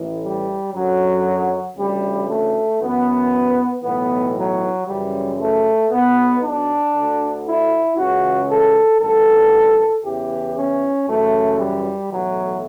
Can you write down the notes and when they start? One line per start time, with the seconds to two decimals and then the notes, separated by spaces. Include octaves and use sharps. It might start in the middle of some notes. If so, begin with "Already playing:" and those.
Already playing: A1 A2 E3
0.20 G3
0.72 F#2 D3 F#3
1.75 D2 C#3 E3 G3
2.27 A3
2.79 F#2 E3 B3
3.82 B1 A2 E3 B3
4.34 F#3
4.86 F#2 C#3 E3 G3
5.37 A3
5.89 B1 B2 B3
6.41 D4
6.93 D2 D3
7.45 E4
7.95 C#2 C#3 E3 F#4
8.48 A4
8.99 A1 G2 D3 A4
10.03 E2 C#3 E3 G4
10.55 C#4
11.06 F#2 C#3 E3 A3
11.58 G3
12.09 B1 A2 E3 F#3